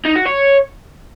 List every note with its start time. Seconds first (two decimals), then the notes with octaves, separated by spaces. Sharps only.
0.06 D#4
0.16 F#4
0.26 C#5